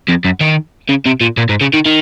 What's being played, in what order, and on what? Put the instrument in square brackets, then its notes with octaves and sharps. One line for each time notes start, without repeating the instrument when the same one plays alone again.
[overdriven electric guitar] F2
F#2
D#3
C#3
C3
A#2
A#2
G#2
C#3
D#3
D#3